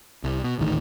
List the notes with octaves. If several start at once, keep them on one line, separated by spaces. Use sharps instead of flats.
C2
B2
D#1 A1 D2 D#3